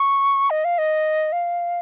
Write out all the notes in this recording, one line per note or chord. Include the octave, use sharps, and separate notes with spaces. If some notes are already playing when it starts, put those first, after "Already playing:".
Already playing: C#6
D#5
F5
D#5
F5